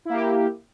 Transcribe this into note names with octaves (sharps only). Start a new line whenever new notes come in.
A#3 E4 G4